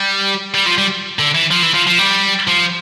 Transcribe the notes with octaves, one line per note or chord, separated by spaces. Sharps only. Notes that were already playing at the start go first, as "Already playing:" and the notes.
Already playing: G3
G3
F3
G3
D3
E3
F3
E3
F3
F3
G3
F3